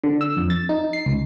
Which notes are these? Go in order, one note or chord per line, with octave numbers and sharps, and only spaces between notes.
D3
E6
F2
A6
D#4
C7
C#2